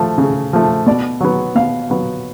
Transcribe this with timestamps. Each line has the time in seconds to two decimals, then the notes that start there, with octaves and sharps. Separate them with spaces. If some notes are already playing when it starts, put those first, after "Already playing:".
Already playing: F3 A3
0.18 C#3
0.53 F3 A3
0.86 B2 D5
1.21 F#3 B3
1.55 B2 F5
1.90 F#3 B3